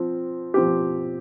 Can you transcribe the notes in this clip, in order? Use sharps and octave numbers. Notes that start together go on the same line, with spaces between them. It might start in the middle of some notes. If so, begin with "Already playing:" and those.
Already playing: F3 C4
F3 C4 G4